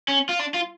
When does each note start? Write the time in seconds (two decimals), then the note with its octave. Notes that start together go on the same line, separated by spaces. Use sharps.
0.08 C#4
0.29 F4
0.39 D4
0.54 F4